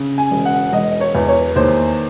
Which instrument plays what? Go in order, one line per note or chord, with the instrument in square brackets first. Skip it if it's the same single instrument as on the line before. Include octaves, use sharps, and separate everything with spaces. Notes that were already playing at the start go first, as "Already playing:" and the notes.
Already playing: [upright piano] C#3
G#5
E1
F#5
E1 D#5
C#5
E2
C#5
D#2 C5